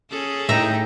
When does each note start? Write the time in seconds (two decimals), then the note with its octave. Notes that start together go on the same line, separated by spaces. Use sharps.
0.10 C#4 G#4 A4
0.49 A2 D#4 E5 G5 A#5